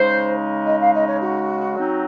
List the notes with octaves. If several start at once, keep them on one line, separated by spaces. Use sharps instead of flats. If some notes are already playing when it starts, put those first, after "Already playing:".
Already playing: C#3 G#3 D#4 C5
D#5
F5
D#5
C#5
F#4
F#3 C4 D#4